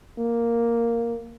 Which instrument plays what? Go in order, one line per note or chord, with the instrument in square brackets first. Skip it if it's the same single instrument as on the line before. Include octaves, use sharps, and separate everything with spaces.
[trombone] A#3